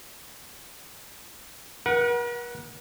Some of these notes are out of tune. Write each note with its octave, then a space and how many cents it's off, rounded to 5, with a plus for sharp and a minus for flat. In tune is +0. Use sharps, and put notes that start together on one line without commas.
A#4 +45 F#5 +0